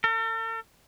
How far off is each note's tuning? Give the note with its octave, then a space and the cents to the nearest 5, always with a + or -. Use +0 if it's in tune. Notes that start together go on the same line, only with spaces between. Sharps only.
A4 +45